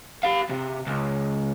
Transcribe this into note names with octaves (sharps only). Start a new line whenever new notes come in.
G4 F5
C3
C#2